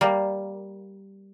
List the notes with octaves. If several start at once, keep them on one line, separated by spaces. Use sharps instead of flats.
G3 A#3